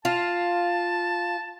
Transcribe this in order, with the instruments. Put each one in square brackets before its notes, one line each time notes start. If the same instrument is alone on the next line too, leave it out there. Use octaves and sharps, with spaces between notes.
[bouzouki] F4 [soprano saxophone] A5